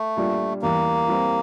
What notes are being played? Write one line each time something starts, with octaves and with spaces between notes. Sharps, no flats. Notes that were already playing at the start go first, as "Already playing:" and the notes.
Already playing: A3
A#2 G3 D4 F4
E2 E3 G3 A#3
E3 G3 C4 E4